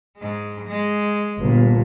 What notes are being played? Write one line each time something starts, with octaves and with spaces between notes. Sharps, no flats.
G#2 G#3
G#3
G1 A#2